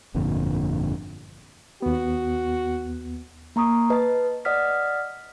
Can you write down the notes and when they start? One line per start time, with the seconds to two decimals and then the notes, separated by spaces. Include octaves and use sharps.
0.15 G1 F2 A#2 D3
1.82 D#2 B3 F#4
3.56 A#3 A#5 C#6 D#6
3.90 B4 D#5 A5
4.45 D5 D#5 F#5 D#6 F6 B6